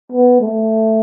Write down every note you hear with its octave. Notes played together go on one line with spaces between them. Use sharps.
B3
A3